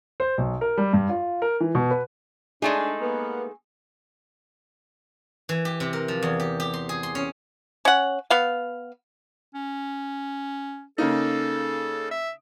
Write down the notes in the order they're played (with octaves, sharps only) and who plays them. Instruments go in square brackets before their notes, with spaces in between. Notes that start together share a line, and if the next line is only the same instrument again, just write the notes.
[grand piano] C5
B1
A#4
G3
G2
F4
A#4
E3
B2
B4
[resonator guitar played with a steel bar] G#3 A3 D#4 [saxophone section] D4 [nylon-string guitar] G#4
[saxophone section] A#3 B3
[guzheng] E3
G4
C3
A#4
F3
E2
G4
G4
C6
G#4
C6
C#4
[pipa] C#4 F#5
B3 F5
[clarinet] C#4
[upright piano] C#3 A#3 D#4 [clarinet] A4
[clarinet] E5